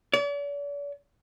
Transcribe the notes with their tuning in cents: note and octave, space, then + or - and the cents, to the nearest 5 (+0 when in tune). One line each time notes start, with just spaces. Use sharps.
D5 -45